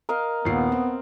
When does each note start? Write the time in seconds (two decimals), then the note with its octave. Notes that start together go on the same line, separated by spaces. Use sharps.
0.09 A#4 D#5 F5
0.45 D#2 A#2 B3 C7
0.72 C4